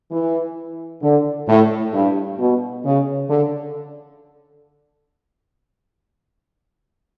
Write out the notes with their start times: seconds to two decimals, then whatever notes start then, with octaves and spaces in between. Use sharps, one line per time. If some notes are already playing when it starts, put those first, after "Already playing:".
0.12 E3
1.02 D3
1.48 A2
1.93 G2
2.39 B2
2.85 C#3
3.30 D3